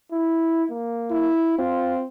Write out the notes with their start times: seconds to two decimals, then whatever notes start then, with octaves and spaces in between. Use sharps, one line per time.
0.12 E4
0.70 A#3
1.11 E4
1.59 C4 F4